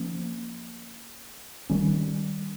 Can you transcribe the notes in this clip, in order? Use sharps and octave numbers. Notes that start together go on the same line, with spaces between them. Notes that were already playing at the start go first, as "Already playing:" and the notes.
Already playing: F3 A#3 C#4
D#3 G3 C#4